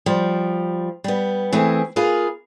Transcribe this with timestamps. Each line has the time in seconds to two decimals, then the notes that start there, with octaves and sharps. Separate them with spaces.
0.06 F3 G3
1.04 G3 B3
1.52 E3 A3 C4 G#4
1.96 A#3 F4 G#4 B4